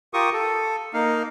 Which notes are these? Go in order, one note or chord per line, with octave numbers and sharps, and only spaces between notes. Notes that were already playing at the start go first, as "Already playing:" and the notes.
F4 G4 A#4 C#6 D#6
A4
A#3 D#4 F5